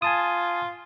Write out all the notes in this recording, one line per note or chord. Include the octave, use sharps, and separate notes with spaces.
F4 G#5 A5 D#6